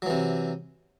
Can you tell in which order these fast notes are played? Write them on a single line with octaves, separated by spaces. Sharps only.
F#3 E3 C3